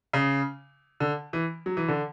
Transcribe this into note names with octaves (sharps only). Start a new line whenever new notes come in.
C#3
D3
E3
F#3
E3
D3